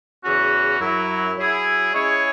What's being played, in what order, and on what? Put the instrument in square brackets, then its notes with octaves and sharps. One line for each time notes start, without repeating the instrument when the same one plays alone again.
[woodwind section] E2 C#3 E3 C#4 F#4
F#2 F#3 E4
F#3 E4 G#4
G#3 C#4 E4 G#4 C#5